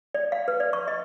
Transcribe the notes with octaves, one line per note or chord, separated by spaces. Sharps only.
D5
F5
B4
D5
C#6
D#5